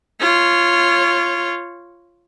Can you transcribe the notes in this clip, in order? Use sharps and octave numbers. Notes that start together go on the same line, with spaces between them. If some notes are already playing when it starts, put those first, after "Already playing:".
F4 C#5